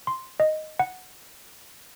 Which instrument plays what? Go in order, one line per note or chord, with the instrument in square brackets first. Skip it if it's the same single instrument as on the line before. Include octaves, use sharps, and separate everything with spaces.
[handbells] C6
D#5
F#5